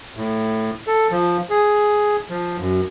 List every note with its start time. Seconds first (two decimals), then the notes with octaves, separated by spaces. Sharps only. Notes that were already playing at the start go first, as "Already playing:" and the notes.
0.17 A2
0.87 A4
1.11 F3
1.50 G#4
2.30 F3
2.59 F#2